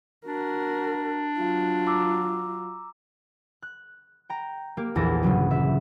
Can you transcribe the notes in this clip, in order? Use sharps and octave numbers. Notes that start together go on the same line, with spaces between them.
D4 F#4 A#4
F#3 F4
A#5 D6 E6
F#6
G5 A#5
A#3 G4
A#1 E2 A4 A#6
G1 C#3 F#3 C#4
E5